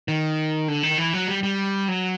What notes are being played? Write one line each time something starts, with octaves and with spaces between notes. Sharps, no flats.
D#3
D3
D#3
E3
F#3
G3
G3
F#3